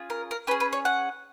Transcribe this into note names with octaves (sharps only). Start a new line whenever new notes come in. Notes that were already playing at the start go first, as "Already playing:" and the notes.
Already playing: C#4 F4 G#4
A#4
A#4
C#4 G#4 B4
B4
C#5
F#5